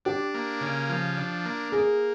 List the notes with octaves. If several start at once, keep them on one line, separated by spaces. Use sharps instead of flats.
D4 G4
A#3
C#3
F3
D4
A#3
A#3 G#4